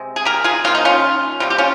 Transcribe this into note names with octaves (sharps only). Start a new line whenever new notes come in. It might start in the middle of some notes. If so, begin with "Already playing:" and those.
Already playing: C3 G#3
G#4
G4 A#4
F4 G#4
D#3 G3 A#3 F4
D#4
C#4 F4
C3 G3 A#3 F4
G4
C#4 F4